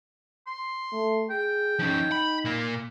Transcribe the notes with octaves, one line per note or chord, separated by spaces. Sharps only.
C6
A3
G#4 G5
F3 C#4 D#4
B5
A#2 A#3